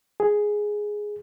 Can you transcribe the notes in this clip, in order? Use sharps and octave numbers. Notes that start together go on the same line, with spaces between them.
G#4